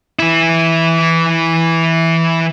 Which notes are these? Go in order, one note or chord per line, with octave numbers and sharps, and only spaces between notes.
E3 E4